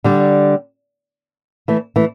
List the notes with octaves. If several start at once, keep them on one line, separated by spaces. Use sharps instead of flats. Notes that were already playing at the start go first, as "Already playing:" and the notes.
D3 G3
E3 A3
E3 A3